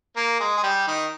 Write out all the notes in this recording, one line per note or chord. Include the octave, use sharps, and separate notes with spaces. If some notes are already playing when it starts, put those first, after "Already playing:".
A#3 A#4
G#3 G#4
G#4
G3 G4
D#3 D#4